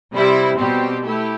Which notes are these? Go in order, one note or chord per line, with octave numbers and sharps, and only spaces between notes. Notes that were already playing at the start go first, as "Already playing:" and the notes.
C3 G3 C4 E4
B2 G3 C4 G4
A3 E4 G4